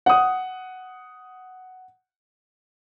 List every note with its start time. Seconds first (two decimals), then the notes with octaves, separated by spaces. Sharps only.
0.06 F#5 D#6